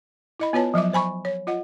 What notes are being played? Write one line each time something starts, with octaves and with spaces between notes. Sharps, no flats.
E4 D#5 B5
B3 F4 B4 C#5 A5
F3 F#3 E5 D6
C5 G#5 B5 C#6
C#5
F4 D#5 F#5